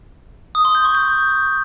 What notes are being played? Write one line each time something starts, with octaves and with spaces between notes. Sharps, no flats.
D#6
C6
G6
C#6
G6